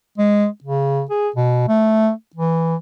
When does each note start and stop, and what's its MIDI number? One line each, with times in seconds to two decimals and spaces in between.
0.18 0.47 56
0.64 1.03 49
1.10 1.29 68
1.36 1.64 47
1.69 2.11 57
2.35 2.76 52